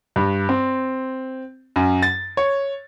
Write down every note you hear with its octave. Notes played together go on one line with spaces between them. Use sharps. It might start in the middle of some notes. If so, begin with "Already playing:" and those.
G2
C4
F#2
A6
C#5